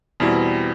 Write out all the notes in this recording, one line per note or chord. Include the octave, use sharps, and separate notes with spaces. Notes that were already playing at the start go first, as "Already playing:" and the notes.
E2 B2 G3 C4 E4